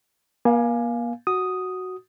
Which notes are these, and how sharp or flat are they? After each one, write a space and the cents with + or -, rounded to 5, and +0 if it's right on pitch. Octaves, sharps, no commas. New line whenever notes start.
A#3 +40 F5 +0 G#5 +5
F#4 +0 D#6 +0